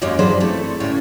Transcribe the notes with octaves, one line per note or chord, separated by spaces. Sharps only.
F#2 G#3 A#3 G4 C#5 D#5
E3 F#3 D4 G#4 B4 C5
C3 A3 E4 A4
A2 C#3 G3 C#5 D5